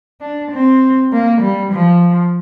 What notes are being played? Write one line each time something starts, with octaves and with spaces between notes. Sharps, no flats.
D4
C4
A#3
G3
F3